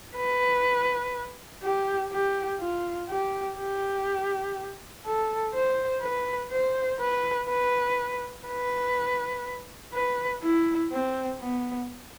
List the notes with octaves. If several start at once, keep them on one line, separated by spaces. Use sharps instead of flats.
B4
G4
G4
F4
G4
G4
A4
C5
B4
C5
B4
B4
B4
B4
E4
C4
B3